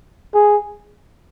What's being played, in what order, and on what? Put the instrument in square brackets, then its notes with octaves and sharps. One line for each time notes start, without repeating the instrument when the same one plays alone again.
[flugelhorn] G#4